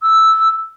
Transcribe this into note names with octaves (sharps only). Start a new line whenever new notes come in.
E6